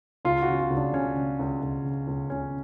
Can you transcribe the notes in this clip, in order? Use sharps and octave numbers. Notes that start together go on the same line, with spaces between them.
C#2 F4
F#4
C#3
F4
C#2
D4
C#3 C#4
C#3
C#2
C#2
C#3
C#2
C#2 C#4